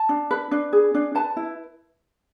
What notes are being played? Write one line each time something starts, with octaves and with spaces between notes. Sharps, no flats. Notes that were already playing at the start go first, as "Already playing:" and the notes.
Already playing: A5
D4
B4
D4
G#4
D4
B4 A5
E4